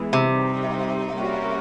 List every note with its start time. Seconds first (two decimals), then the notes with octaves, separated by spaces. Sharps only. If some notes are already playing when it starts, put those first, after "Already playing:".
Already playing: E3 G#3 B3 E4 G#4
0.13 C3
0.32 G3 C4 D#4
1.14 G3 A#3 C#4 F#4 A#4